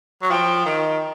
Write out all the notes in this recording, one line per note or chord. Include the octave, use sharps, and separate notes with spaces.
F#3
F3 G5
D#3